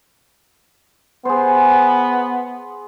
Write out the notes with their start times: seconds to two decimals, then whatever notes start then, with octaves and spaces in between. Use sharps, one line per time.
1.25 B3 G#4 C5